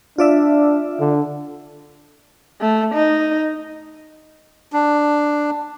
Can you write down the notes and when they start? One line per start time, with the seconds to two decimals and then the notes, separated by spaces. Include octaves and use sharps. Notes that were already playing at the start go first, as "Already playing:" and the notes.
0.18 D4 F4 D5 E5
1.00 D3
2.61 A3
2.95 D#4
4.73 D4